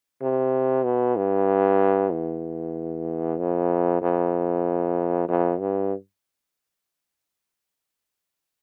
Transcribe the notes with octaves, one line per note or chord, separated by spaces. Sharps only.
C3
B2
G2
E2
F2
F2
F2
G2